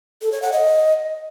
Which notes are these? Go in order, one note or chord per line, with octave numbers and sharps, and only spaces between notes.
A4
C#5
F#5
D#5